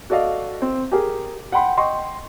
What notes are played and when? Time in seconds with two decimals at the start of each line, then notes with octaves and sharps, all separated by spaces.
0.10 F#4 A4 D5 D#5 F5
0.62 C4
0.92 G4 G#4 A#4
1.52 F#5 G5 B5 C6
1.77 D#5 G5 C6 C#6